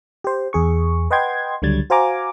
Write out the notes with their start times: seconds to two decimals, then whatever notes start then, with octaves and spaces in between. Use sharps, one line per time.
0.24 G4 C5
0.53 E2 G#4 C#6
1.10 B4 D#5 F#5 G5 C6 G#6
1.62 C#2 D3 F#3 G3 G#6 A6
1.90 F#4 C5 F5 G#5 A#5 D6